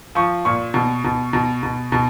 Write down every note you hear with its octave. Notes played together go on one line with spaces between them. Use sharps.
F3 C#6
A#2 C#6
B2
B2
B2
B2
B2